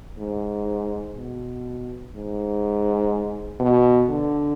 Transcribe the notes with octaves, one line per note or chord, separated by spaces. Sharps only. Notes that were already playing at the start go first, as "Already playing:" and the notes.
G#2
B2
G#2
B2
D3